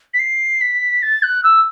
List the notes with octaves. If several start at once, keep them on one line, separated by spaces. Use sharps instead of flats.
B6
C7
B6
A6
F#6
E6